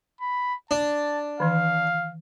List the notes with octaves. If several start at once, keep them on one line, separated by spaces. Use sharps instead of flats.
B5
D4 A5
D#3 E3 F5